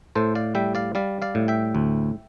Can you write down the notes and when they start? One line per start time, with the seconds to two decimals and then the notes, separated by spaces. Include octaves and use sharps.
0.15 A2 A4 C5
0.35 D5 F5
0.55 G3 E5 G5
0.75 D5 F5
0.95 G3 D5 F5
1.22 D5 F5
1.35 A2
1.48 E5 G5
1.75 D2